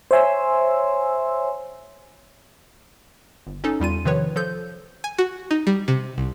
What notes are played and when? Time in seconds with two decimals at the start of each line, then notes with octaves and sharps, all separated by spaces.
0.11 C5 C#5 E5 G#5 C6 E6
3.47 G1
3.64 C#4 D#4 A4
3.80 E2 G3 F4 D#7
4.05 C3 D#3 F3 B4 C#5
4.36 F3 A4 G6
5.04 G#5
5.18 F#4
5.51 D#4
5.67 G3
5.88 C3
6.18 C2